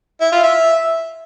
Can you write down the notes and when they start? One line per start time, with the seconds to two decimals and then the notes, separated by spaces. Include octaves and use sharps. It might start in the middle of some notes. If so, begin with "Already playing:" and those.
0.21 E4
0.32 F4
0.43 E5